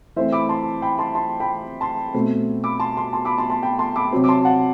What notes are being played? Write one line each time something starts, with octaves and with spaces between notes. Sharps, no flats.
E3 A3 C4 C5 E5
B5 D6
A5 C6
G5 B5
A5 C6
A5 C6
G5 B5
A5 C6
B2 A3 C4
B5 D6
A5 C6
A5 C6
A5 C6
B5 D6
A5 C6
A5 C6
G5 B5
A5 C6
B5 D6
C3 F#3 C4
D6
A5 C6
F#5 A5